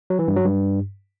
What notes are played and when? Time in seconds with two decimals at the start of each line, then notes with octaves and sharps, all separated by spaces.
0.10 F#3
0.19 E3
0.28 G2
0.36 F#3
0.45 G2